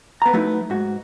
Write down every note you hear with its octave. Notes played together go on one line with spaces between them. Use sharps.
B3 A#5
F#3 A3 B3 D#4 E4
G#2 F#4